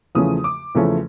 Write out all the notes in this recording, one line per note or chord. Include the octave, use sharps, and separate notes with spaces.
E2 C#3 F3 A3 C#4 D#6
D6
E2 C#3 F3 A3 C#4